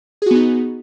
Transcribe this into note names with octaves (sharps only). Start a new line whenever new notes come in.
B3 D#4 F#4 G#4